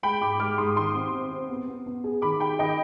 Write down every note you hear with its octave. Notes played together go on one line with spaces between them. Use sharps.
G#3 G5 B5
G#2 B5 D6
G#3 D6 F6
G#2 C6 D#6
D#3 C6 D#6
C4
C4
C4
B3
B3
B3
G#4
D#3 B5 D6
G#4 G5 B5
D#3 D#5 G5